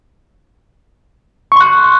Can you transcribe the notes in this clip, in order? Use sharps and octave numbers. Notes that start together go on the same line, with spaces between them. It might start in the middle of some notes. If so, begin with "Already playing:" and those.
C6 C#6 F#6